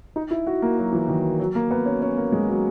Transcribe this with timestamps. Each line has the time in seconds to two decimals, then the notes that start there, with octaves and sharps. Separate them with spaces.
0.16 D#4
0.31 E4
0.47 F#4
0.62 A#3
0.78 F#3
0.93 E3
1.08 D#3
1.39 F#3
1.55 A#3
1.71 B3
1.86 C#4
2.02 C#4
2.17 A#3
2.32 G#3
2.48 F#3